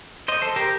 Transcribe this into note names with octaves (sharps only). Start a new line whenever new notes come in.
C5 D#5
A4 C5
G4 A#4